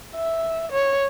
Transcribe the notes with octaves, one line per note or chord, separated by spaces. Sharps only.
E5
C#5